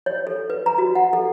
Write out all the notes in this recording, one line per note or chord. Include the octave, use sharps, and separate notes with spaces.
C#5
A4
B4
A#5
F#4
F#5
A4